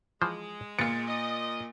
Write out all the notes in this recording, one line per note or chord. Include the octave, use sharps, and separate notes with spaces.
E3 F3 G#3 C5
A#2 B3 F4 A6 C#7
D#5